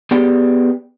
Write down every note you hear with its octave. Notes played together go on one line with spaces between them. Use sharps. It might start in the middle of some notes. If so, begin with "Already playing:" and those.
B3 G4 G#4 D5 G5